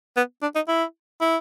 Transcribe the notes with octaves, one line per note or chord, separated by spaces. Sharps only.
B3
D4
D#4
E4
E4